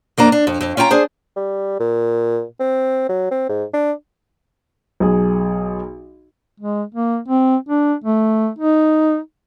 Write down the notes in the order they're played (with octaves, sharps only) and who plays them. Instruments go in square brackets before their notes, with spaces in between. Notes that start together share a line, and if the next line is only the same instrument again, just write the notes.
[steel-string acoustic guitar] F2 A#3 D4 A#5
D4
F2
F2
C#4 F4 G5 G#5 A#5
D4 G#4 C5
[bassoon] G3
A#2
C4
F#3
C4
G#2
D4
[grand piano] B1 G#4
[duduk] G#3
A#3
C4
D4
A3
D#4